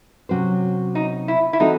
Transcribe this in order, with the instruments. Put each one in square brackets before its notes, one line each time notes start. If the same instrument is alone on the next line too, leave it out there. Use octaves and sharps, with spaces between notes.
[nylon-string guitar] C3 F#3 C#4 F#4 C5
[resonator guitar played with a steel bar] D#4
E4
E4
[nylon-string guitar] E3 C4 F#4 A4 [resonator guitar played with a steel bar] D#4